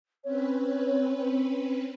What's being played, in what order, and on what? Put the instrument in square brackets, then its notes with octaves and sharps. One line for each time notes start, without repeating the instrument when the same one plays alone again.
[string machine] C4 C#4 B4 [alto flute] C#5